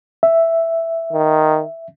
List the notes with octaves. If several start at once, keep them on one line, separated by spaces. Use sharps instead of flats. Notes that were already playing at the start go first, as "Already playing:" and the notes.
E5
D#3